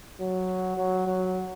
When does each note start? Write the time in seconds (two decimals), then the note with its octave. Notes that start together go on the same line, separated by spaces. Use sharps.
0.20 F#3
0.77 F#3
1.07 F#3